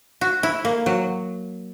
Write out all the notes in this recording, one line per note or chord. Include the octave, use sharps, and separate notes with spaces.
F#4
E4
A#3
F#3